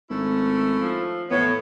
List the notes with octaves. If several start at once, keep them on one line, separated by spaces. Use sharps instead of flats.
G#1 A3 C#4 E4
F3
E2 A2 B3 C#5